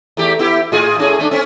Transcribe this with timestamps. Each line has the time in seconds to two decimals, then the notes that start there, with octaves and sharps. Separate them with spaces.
0.17 E2 A3 G4
0.39 B3 E4 G4
0.72 A2 F4 G#4
0.98 A2 C#4 G#4
1.19 A3 C4 D4
1.31 C4 C#4